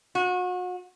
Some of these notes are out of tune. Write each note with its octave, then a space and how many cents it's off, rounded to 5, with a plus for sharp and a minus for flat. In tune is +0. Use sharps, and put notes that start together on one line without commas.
F#4 -35